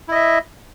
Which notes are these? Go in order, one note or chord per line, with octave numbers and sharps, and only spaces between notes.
E4 D#5 E5